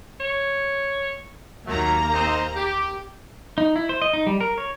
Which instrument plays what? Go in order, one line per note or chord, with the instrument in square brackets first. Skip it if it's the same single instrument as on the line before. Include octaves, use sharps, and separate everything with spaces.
[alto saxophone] C#5
[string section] D#2 A#3 A#5 [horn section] F#3 A3
[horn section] C4 D#4 C5
G4
[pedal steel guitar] D#4
E4
C5
D#5
D#4
G3
A#4
C#5